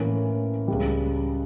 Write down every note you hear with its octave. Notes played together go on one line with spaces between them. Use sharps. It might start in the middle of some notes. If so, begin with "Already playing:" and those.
Already playing: A2 E3 A#3 C#4
C#2 C#3 G3